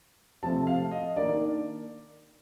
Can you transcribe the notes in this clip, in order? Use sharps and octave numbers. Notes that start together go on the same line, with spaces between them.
C3 F3 A3 C4 A5
F5
D#5
D#3 A#3 D4 D5